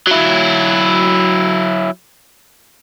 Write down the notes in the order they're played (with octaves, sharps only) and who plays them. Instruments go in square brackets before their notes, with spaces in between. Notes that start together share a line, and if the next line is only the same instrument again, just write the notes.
[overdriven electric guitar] F#3 E4